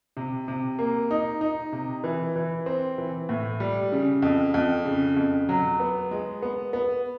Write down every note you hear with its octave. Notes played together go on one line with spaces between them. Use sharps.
C3
C3
A#3
D#4
D#4
C3
E3
E3
C4
E3
A2
G3
C#3
F2
F2
C#3
F2
F#3
B3
G#3
B3
B3